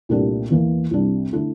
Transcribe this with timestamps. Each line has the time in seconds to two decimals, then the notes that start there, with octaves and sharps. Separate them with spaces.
0.09 C2 A#2 A3 D4 G4
0.50 E2 E3 A#3
0.91 C2 C3 G3 D4
1.33 D3 A3 E4 A4